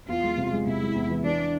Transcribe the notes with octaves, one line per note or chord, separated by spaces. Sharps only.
E2 F4
G#3
C3
G#3
C3 E4
G#3
E2
E3
E3 D4